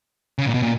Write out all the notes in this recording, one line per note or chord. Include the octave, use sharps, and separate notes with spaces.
C#3
A#2
B2
A#2